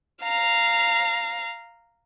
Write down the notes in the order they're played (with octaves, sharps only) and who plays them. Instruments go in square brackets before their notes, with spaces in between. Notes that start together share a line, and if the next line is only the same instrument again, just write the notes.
[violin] F5 A#5